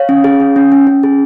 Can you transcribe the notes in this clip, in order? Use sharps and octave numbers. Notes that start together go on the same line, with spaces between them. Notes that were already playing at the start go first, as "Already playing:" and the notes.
Already playing: C#5 F5
C#4
G#4
C#4
C#4
C#4
C#4
G#4